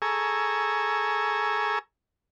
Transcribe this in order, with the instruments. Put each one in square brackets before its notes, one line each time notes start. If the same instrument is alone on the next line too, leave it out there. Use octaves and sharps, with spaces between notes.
[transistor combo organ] G#4 A4 G#5 A#5 C#6 E6